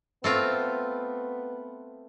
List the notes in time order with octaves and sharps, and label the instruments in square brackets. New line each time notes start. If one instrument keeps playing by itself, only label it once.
[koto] A3 C4 F4 [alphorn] B3